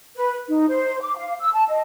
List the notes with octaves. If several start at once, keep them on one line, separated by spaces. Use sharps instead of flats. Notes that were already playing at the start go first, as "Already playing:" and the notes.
B4
D#4
C5
D6
F5
E6
A5
D#5